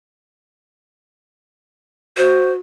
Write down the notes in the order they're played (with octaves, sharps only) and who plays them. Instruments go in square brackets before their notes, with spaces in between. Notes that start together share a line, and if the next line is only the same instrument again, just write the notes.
[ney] F#4 [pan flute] C5